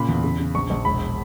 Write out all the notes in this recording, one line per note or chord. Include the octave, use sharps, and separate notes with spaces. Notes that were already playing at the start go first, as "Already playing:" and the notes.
Already playing: A#2 C#3 B5
E2
C#3
C#3
A#1 C#6
A#1
E1 B5